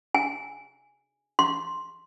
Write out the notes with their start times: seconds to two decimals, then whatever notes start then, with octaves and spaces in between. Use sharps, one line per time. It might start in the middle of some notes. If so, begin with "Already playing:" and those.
0.15 G#5
1.39 C6